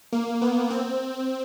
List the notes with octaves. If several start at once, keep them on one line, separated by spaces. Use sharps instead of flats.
A#3
B3
C4